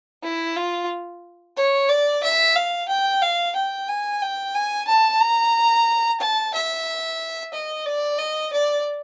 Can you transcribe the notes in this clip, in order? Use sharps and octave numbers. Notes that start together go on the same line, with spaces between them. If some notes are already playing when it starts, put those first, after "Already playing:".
E4
F4
C#5
D5
E5
F5
G5
F5
G5
G#5
G5
G#5
A5
A#5
A5
E5
D#5
D5
D#5
D5